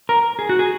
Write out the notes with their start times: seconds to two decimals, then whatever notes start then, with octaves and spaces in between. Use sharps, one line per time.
0.09 A#4
0.39 G#4
0.49 F#4
0.59 G#4